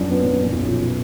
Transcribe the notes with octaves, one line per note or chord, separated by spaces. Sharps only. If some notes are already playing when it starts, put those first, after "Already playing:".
Already playing: F#2 F3 D4
B3
F#2
A#2
B1
F3